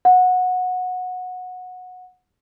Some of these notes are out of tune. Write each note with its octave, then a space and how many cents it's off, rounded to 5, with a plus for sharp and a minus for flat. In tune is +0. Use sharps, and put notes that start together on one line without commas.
F#5 -20